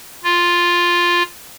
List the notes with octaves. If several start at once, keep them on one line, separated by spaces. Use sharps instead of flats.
F4